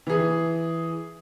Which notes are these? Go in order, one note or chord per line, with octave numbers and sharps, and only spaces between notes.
E3 G#4